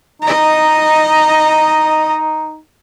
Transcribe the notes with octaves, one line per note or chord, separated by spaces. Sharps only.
D#4 D#5 A#5